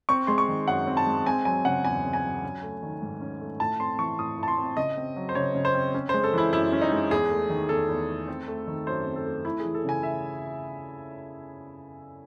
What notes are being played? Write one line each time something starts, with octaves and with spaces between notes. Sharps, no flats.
C4 C#6
G#3 C6
C#6
D#3
F#2 F#5
C4
A5
G#3
C4 G#5
F#3 G#5
C#3 F#5
E2 G#5
C4
G#5
F#3
C#4
A3
D#3
G#2
C#4
A3
A2 A5
C4 C6
E3 C#6
A2 D#6
A2 A5
C6
C4
C#3 D#5
C4
F#3
C5
C#3 C#5
C#3
C5
C4
C#4
G#3 C5
A4
E3 E4
F#2 E4
C#4
D#4
G#3
E2 G#4
A3
D#3
E2 A4
E2
A3
C4
A3
D#3
F#2 C5
C4
A4
A3
A3 E4
G#4
E3
A4
C#3 G#5
E5